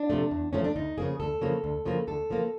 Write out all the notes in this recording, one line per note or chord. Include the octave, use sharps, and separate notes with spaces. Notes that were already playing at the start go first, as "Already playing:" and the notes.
Already playing: D4
C3 F3 A3
E2
C3 F3 A3 C#4
D4
D2 D#4
C#3 F3 A#3 G#4
D2 A4
C#3 F3 A#3
D2
C#3 F3 A#3
D2 A4
C#3 F3 A#3